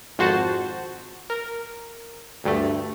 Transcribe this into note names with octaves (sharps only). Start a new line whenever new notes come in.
G#1 F2 F#4 C5 A5
A#4
D2 G2 A3